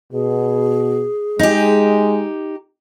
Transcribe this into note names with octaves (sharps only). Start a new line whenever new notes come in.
B2 G#4
G#3 D#4 G4